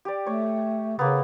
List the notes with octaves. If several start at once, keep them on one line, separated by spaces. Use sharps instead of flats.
G4 D5
A3 C#5
C#3 A#3 B3